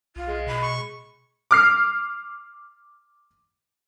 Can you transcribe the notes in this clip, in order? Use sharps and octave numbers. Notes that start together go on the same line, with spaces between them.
B1 F4
G#3
B2 B5
C#6
D6 F6 C7